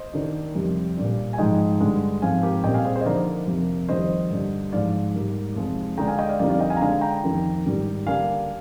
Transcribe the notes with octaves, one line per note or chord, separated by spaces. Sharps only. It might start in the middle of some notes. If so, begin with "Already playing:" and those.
Already playing: C5 D#5
D#3 A#3 D4
F2 C3 G3
A#2 G3 D4
G#5
G#2 F3 G#3 D#4 D#5 G5
G2 D3 G#3
G#2 F3 C4 F5 G#5
G4 A#4
A#2 G3 C4 D#5 G5
F5 G#5
G#4 C5
G#4 C5
D#5
D3 F3 A#3 D#4 A#4 D5
F2 C3 F3 A#3
F2 D#3 G3 C5 D#5
G2 D3 G3 D4
G#2 F3 G#3 D5 F5
G#2 G3 A#3
F2 C3 F3 G#3 D#4
D3 G#3 D4 G5 A#5
F5 G#5
D#5 G5
D5 F5
F2 D3 G3 C4 D#4 A#4 D5
D5 F5
D#5 G5
F5 G#5
A#5
D3 G#3 D4 F5 G#5
G5 A#5
F2 D#3 A#3 D#4
G#2 D#3 G3
D3 G3 A#3 D4 F5 G#5